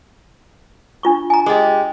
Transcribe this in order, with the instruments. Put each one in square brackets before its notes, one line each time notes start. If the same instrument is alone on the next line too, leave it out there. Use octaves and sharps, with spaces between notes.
[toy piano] D4 F4 C#6
G#5 A#5
[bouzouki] G#3 G4 [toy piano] G#4 D#5